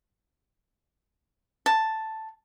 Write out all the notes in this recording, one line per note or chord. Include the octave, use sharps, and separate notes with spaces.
A5